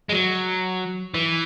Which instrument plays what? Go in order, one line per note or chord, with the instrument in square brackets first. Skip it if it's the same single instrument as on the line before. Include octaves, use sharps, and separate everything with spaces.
[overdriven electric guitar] G#3
F#3
E3